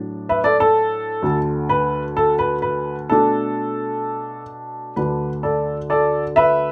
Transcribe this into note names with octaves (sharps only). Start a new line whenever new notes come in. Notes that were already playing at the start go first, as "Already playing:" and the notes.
Already playing: A2 F#3 D4
B4 E5
A4 D5
A4
D2 D3 A3
B4
A4
B4
B4
B2 A3 D4 A4
D2 D3 A3 D4 B4
A4 D5
A4 D5
B4 E5